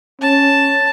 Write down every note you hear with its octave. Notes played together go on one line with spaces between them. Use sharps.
C#4 A5